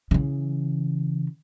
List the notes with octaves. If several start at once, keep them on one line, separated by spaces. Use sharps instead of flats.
C#3 E3